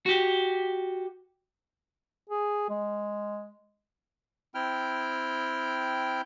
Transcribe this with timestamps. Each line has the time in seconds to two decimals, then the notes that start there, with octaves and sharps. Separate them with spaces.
0.06 F#4 G4
2.30 G#4
2.69 G#3
4.54 C4 E4 G5 F6